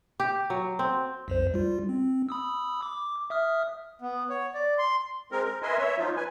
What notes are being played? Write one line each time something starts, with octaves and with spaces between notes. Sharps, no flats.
G4
F#3
C4
B1 F2 C5
G3 F4
C4
B5 D#6 E6
D6
E5 D#6 F6
B3
C#5
D5
C6
G#3 C4 A#4
A#4
A#4 B4 D#5 E5 G#5 C6
C#5 E5
F3 F#3 D#4 F4
B4 G#5